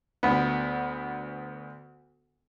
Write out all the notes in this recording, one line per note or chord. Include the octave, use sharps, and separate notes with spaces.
D2 B3